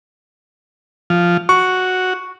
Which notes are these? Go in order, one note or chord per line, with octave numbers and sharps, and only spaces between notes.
F3
F#4 C#6